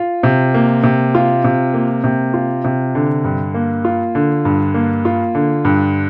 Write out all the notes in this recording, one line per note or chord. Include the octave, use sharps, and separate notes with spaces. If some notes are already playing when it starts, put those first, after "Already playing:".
Already playing: F4
C3
A#3
C3
F4
C3
A#3
C3
F4
C3
D3
G2
A#3
F4
D3
G2
A#3
F4
D3
G2